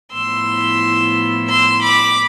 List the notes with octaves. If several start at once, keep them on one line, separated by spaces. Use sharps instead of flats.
A2 F3 B3 E4 C6 E6
C6 E6
B5 D6